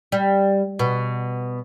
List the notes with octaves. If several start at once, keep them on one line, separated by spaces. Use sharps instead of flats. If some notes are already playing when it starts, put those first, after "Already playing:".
G3
B2